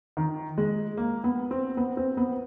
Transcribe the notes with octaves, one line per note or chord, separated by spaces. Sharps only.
D#3
G#3
A#3
B3
C4
B3
C4
B3